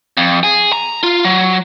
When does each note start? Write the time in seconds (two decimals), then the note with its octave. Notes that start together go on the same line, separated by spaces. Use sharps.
0.17 F2
0.43 G#4
0.73 A#5
1.03 F4
1.25 F#3